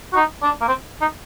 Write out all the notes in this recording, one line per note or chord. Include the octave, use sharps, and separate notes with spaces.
F#4
D#4
D4
A#3
C4
D#4